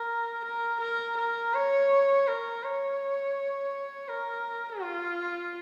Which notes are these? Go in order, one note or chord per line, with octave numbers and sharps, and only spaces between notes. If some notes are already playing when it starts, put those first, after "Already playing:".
Already playing: A#4
A#4
A#4
A#4
C#5
A#4
C#5
A#4
F4